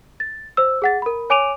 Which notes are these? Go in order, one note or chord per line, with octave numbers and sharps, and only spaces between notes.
A6
C5 E6
G#4 F#5 A6
A#4 B5
C#5 G#5 D6 D7 D#7 F7